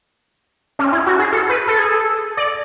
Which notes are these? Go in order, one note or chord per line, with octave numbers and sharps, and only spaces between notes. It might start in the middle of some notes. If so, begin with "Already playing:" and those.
C#4
E4
F#4
G#4
A4
B4
A4
G#4
A4
D5